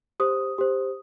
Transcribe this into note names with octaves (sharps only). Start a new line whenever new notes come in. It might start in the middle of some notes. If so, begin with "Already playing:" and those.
G4 C5 D#6
G4 C5